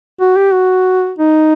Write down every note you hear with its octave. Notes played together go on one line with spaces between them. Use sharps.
F#4
G4
F#4
D#4